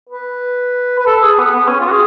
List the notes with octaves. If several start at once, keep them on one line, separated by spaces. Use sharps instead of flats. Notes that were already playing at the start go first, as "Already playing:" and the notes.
B4
B4
A4
G#4
B3
B3
C#4
F4
F#4
G#4